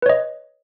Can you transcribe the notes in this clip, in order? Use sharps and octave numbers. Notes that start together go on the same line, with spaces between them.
B4 C#5 D#5